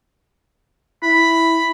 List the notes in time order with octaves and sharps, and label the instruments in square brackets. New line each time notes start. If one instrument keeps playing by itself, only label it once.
[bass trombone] E4 [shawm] B5